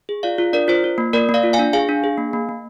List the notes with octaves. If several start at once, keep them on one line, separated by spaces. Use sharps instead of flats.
G#4
F4 D5 F5
F4
D4 A#4 D5
F4 C5
F4
A#3
A#3 A#4 D5
A#3
D5 F5
F4
F5 G#5
D4
G#4 F5 G#5
D4
G#4
A#3
A#3
A#3